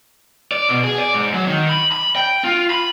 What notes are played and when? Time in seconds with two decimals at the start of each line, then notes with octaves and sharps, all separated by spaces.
0.52 D5
0.69 B2
0.83 G#4
0.98 D5
1.14 G#2
1.34 F#3
1.47 D#3
1.69 B5
1.92 B5
2.16 G5
2.44 F4
2.70 B5